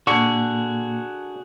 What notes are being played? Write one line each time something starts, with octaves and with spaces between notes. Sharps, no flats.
A#2 D3 A#3 F#4 G#4 C#6